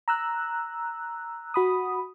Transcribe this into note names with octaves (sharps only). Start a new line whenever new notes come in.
A#5 E6 F#6
F#4 B5 D#6